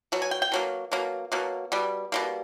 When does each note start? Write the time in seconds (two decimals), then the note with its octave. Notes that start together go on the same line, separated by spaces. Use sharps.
0.12 B2 F#3
0.22 G#5
0.31 G5
0.42 G5
0.52 B2 F#3 A#3
0.92 B2 F#3 A#3
1.32 B2 F#3 A#3
1.72 B2 G3
2.12 B2 G3 A#3